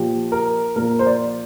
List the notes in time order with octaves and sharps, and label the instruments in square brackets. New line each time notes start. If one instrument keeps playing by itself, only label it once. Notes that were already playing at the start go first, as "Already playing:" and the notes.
Already playing: [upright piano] A#2 F3 G4
A#4
A#2 F3 A#4
C5
D5